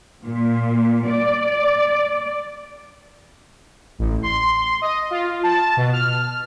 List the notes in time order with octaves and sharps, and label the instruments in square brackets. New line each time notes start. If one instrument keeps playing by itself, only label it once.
[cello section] A#2
D5
[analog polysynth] A1
C6
D#5
F4
A5
B2
F6